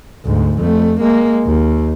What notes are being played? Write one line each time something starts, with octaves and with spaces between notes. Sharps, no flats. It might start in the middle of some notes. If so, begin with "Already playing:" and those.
D2 G#2
F2 A3
G#3 A#3
D#2